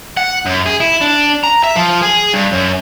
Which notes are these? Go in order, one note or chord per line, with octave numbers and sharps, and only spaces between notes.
F#5
F#2
G#4
E4
D4
A#5
E5
F3
G#4
G2
F#2